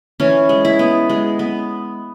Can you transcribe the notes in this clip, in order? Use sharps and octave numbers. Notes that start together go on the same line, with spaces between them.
E3 C#4
G#3
E4
B3
G#3
B3